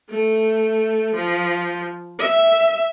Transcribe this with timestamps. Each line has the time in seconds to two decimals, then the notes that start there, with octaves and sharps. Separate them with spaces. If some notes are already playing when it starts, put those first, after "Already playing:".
0.10 A3
1.15 F3
2.19 E5